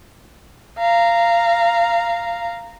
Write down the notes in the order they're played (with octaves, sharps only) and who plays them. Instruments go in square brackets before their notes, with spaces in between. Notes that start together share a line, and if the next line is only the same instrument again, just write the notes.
[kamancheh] F5 A#5